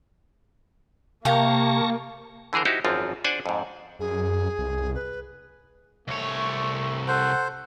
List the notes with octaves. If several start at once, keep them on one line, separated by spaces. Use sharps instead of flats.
C3 A#3 F5 G5 A5 C#6 A#6
D3 E3 G#4 A#4 C5
D#4 E4 F#4 G4 C5
G#1 F#2 F3 C4 F4
D4 C5 D5 F#5 G#5
F2 G#2
F#2 G#4
C2
B4
C2 A3 C#5
A4 C5 F#5